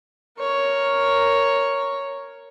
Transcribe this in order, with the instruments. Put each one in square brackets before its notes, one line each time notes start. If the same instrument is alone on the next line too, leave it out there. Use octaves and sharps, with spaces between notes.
[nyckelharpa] A#4 C#5